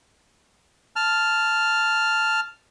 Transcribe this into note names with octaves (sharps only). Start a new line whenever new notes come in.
A5 F6